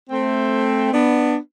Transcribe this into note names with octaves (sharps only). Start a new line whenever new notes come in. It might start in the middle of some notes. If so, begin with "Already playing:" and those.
A3 C4
B3 D4